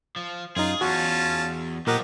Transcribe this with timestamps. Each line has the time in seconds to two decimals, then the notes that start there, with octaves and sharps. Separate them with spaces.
0.16 F3
0.56 F#2 D#4 F4 G#4
0.81 E2 C#4 F4 F#4 A5
1.87 A#2 F3 F#3 G4 A#4 D#5 F#5